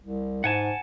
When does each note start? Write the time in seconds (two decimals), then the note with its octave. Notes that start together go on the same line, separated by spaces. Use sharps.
0.02 C2
0.44 G#2 F#5 G#5 A5